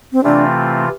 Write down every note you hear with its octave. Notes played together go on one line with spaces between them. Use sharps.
C4
C3 E3 A3 C4 D4 F4